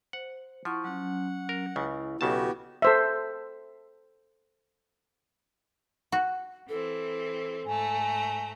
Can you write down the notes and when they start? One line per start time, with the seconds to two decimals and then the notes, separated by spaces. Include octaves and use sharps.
0.13 C5 F#5
0.65 F3 E4 F#5 C#6
0.84 F#3 C#4 F#5
1.49 A#4
1.76 C#2 C#3 E4
2.21 B1 C#3 B3 F#4 G4 A5
2.82 A4 C5 E5
6.12 F#4
6.69 E3 C4 A4
7.66 G#2 A3 G#5 A#5